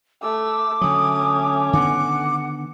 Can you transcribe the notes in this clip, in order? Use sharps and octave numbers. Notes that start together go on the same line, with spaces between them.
A3 D6 E6
D3 F#3 A3 C#4 D#6
D3 D#3 B3 F#5 D6